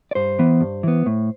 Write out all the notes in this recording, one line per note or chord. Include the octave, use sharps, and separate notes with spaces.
D5
G2 C5
E3 B3
G2
E3 B3
A2